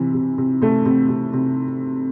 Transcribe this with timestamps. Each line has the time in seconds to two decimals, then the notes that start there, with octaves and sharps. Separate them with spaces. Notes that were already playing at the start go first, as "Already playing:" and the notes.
Already playing: C3 E3
0.14 C3
0.38 C3
0.61 C3 A3
0.85 C3
1.09 C3
1.33 C3